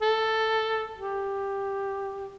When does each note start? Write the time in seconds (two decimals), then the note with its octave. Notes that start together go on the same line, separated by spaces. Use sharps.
0.01 A4
0.97 G4